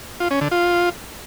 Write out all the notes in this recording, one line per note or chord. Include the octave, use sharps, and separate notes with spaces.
F4
C#4
D3
F4